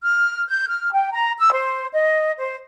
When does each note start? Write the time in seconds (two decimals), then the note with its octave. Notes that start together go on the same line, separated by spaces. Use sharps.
0.02 F6
0.48 G6
0.68 F6
0.92 G5
1.12 A#5
1.39 E6
1.53 C5
1.92 D#5
2.39 C5